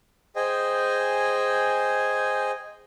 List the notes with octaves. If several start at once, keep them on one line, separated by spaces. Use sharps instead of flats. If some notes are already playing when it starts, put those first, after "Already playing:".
G#4 C5 D#5 G5 G#5